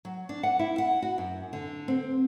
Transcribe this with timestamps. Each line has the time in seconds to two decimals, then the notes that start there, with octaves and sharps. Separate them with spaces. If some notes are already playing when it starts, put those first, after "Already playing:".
0.05 F#3
0.29 D4
0.43 F#5
0.59 E4
0.78 F#5
1.02 F#4
1.18 F#2
1.53 D3
1.88 C4